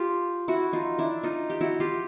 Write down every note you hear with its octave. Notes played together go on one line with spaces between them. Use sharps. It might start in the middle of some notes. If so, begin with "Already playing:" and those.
Already playing: F4 G4
E4 F#4
D#4 F4
D4 E4
D#4 F4
G4
E4 F#4
F4 G4